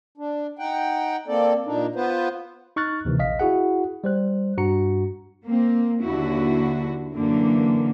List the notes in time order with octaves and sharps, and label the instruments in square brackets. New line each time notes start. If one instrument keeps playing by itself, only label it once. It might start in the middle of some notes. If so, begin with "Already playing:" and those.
[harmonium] D4
D#4 F#5 G5
A#3 C4 A4 D5
A#2 D4 D#4
B3 F4 B4 C5
[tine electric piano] D#4 C#6 F6 F#6 A6
D#2 C3 D#3 E3
A#1 D#5 F5 B6
E4 F#4 G#4 F#5
G3 C5 F#6
G2 F#4 A#5 C#7
[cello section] A#3 C4
D#2 D3 E4 F#4
F#2 D3 E3 A#3